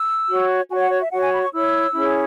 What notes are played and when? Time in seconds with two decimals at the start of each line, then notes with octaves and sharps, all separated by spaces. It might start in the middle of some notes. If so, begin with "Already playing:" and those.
Already playing: E6
0.29 F#4 C#5
0.70 F#4 G#5
0.74 C#5
0.80 F#5
0.90 C#5
1.01 E5
1.12 F#4 C#5 F#5
1.22 G#5
1.32 B5
1.42 C#6
1.53 E4 C#5 E6
1.94 C#4 E4 G#4 C#5